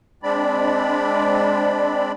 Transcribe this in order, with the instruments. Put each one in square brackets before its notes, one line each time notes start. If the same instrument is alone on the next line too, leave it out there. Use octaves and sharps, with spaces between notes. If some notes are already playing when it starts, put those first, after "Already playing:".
[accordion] G#3 C4 D4 D5 B5